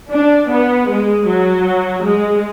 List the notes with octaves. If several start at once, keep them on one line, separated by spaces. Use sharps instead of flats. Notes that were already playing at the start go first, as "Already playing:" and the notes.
D4
B3
G#3
F#3
G#3